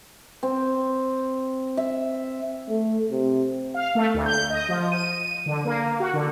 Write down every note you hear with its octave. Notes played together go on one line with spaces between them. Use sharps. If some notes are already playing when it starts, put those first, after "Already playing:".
C4
E5
A3
C3
F5
A3
D2
G6
D#5
F3
D#7
D3
A#3
F#4
D3